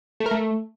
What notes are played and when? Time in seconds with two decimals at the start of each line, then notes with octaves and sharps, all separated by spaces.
0.20 A3
0.26 A#4
0.31 A3